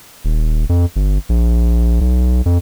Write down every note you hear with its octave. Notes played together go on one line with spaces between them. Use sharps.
D#1
F2
G1
A#1
B1
F2